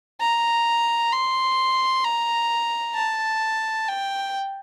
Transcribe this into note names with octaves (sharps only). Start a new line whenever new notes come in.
A#5
C6
A#5
A5
G5